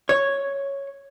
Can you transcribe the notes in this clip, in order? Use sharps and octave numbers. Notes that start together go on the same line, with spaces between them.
C#5